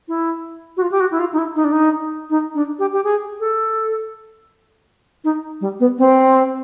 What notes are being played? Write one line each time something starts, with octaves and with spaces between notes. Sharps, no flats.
E4
F#4
F4
G4
F#4
E4
F4
D#4
E4
D#4
D4
D#4
D#4
D4
G4
G4
G#4
A4
D#4
G3
B3
C4